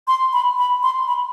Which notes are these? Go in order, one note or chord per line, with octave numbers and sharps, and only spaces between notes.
C6
B5
B5
C6
B5